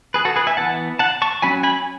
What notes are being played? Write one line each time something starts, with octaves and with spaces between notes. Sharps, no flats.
G#4 B4
F#4 A4
G#4 B4
E5 G#5
E3 B3 F#5 A5
F#5 A5
A5 C#6
F#3 C#4 G#5 B5
G#5 B5